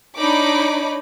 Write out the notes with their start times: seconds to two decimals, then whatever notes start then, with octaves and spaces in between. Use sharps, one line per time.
0.17 D4 D#4 C#5 B5 D6